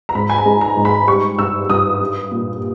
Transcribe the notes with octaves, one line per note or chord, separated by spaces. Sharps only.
A#5
G#2 B5
G#5
A#5
G#3
A#5
G#2
B5
G3 C#6
G2 E6
G2 D#6
G3
A#2